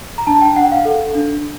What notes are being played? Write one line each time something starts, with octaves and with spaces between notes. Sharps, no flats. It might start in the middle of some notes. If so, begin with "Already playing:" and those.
A#5
D4 A5
G5
D4 F#5
F5
A4
D4